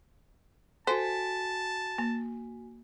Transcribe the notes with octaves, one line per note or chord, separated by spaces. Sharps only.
F#4 A4 C5 G#5 A5 B6
A#3